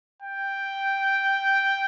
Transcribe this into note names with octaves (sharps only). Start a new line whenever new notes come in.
G5